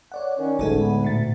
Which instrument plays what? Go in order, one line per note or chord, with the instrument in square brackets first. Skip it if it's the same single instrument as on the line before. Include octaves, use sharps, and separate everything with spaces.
[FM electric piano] C#5 D5 F#5
[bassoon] D#3 [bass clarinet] C#4
[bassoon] D2 [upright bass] A2 D3 [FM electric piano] G#3 D#4 A4
[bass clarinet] B3
[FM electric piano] A#2 A6 [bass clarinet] A3